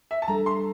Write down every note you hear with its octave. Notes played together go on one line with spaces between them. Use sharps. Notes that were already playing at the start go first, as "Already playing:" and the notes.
E5
A5
G3 D4 A4 A#5
C6